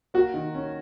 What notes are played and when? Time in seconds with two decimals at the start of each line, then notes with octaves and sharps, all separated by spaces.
0.14 A#3 F#4
0.34 D#3
0.54 C#4